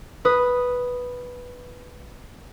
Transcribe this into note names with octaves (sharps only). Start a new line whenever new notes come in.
B4 D#6